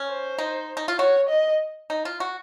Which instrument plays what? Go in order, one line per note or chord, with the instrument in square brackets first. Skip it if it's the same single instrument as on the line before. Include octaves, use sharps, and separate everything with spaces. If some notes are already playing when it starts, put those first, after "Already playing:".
Already playing: [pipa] C#4
[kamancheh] C5
[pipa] D#4
D#4
F4
[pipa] F#4 [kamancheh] C#5
[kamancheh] D#5
[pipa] D#4
F4
F#4